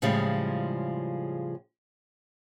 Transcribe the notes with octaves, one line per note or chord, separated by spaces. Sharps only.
A2 C#3 F3 G3 G#3